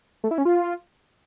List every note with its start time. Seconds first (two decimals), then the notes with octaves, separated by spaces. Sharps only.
0.24 A3
0.31 E4
0.38 C#4
0.45 F4